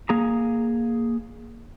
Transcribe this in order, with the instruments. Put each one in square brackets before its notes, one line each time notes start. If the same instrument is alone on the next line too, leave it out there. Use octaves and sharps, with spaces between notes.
[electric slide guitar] A#3 G#4 A#5